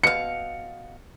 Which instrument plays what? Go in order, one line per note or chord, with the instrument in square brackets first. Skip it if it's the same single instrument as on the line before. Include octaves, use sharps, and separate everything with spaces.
[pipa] B2 F5 [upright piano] C#7